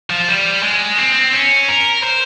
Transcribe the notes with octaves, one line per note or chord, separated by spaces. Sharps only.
F3
G3
G#3
C4
C#4
A#4
C5